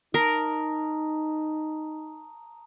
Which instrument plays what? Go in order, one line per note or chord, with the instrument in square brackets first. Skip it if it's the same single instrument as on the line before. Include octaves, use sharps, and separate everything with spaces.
[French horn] D#4 [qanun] A#4 [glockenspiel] A5 A#5 D#6